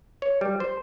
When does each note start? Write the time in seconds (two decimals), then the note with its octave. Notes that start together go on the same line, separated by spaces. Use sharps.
0.22 C#5
0.41 G3
0.60 C5